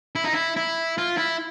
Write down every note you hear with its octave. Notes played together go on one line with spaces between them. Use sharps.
E4
D#4
E4
E4
F4
E4